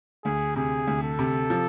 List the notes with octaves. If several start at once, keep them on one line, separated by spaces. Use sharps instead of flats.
D2 G#4
C3 G#4
D2
A4
C3
F3